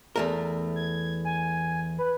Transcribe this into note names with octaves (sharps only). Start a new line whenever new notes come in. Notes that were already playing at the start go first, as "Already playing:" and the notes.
E2 A3 A#4
G#6
G#5
B4